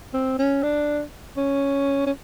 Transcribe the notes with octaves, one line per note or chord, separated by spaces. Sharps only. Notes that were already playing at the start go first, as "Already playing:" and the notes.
C4
C#4
D4
C#4
C#4